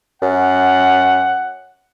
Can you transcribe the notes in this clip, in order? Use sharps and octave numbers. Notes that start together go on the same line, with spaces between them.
F#2 F#5